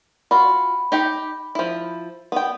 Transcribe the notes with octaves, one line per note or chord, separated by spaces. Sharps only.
F4 F#4 B5
D#4 G4 G5
F3 E4
B3 G5